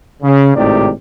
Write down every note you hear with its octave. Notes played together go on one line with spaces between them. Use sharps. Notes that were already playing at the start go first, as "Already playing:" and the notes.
C#3
G#1 A2 C3 D#3 G4 D5